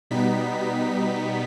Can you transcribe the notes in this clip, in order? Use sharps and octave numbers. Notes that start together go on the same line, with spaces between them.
B2 G3 B3 D#4 B6